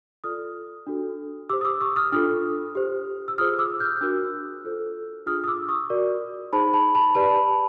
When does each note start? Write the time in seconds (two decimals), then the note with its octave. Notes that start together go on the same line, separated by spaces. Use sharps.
0.24 F4 A4 D5 D#6 F6
0.87 D4 F#4 A4
1.49 G4 C5 D6 E6
1.61 D#6
1.65 D6 E6
1.81 C#6 D#6
1.96 D#6 F6
2.12 D4 F4 A4 D#6 F6
2.75 G4 C5
3.28 E6
3.38 F4 G#4 C5 D#6 F6
3.59 D6 E6
3.80 F6 G6
3.96 F6
4.01 D4 F#4 A#4 E6 F#6
4.64 F4 A4 C5
5.26 D4 F4 G#4 D#6 F6
5.44 D#6
5.47 D6 E6
5.69 C#6 D#6
5.90 F#4 A#4 D5
6.53 D#4 G#4 C5 A5 B5
6.73 A5 B5
6.95 A5 B5
7.15 G4 B4 D5 A5 B5